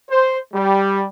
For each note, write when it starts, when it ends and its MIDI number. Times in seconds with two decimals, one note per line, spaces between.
0.10 0.39 72
0.54 1.06 55